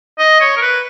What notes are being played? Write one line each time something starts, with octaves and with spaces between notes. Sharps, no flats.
D#5
C#5
A#4
B4